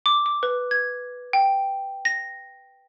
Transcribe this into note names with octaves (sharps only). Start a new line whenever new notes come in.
D6
D6
B4
G#6
G5
A#6